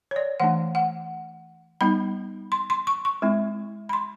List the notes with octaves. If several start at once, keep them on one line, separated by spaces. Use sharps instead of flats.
C#5
D5
E3 A3 D4 F#5
F#5
G3 B3 D#4 B5
C6
C6
C#6
C#6
G#3 C4 E4
B5
C6